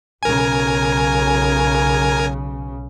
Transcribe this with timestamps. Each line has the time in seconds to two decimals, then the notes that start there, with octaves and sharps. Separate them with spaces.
0.23 B1 C#3 A#4 G#5